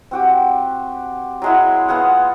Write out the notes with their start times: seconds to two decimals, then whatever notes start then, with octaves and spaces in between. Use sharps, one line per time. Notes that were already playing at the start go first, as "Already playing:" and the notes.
0.11 C4 F#4 G4
1.42 F#3 G#3 E4
1.88 B3 F4 G#4 F#5